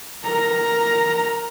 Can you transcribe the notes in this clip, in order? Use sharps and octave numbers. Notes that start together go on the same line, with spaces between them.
A#4 A#5